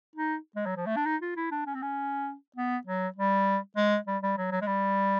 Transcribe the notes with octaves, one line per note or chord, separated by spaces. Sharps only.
D#4
G#3
F#3
F3
A3
D4
D#4
F4
E4
D4
C#4
C4
C#4
B3
F#3
G3
G#3
G3
G3
F#3
F#3
G#3
G3